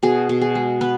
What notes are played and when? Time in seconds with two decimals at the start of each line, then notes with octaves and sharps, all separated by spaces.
0.03 B2 G#4
0.29 B2
0.41 G#4
0.55 G#3
0.81 B3 B4